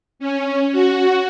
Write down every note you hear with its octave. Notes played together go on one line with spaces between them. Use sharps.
C#4
F#4